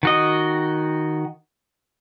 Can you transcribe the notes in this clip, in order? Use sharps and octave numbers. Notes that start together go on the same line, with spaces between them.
D#3 F#4 D#5